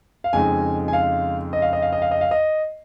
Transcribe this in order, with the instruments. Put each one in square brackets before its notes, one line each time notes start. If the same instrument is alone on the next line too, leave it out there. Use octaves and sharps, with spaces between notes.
[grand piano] F5
F2 C#3 G#3 D#4 G#5
G#5
F5
D#5
F5
D#5
F5
D#5
F5
D#5
F5
D#5